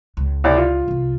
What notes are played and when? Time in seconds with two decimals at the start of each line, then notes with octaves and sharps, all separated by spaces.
0.17 C#2
0.44 C2 D5
0.58 F4
0.88 C2 F2